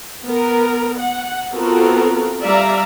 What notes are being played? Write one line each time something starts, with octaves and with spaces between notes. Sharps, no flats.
B3 A#4
F#5
B3 C4 F4 F#4 A4 A#4
G3 D5 E5 F5 A#5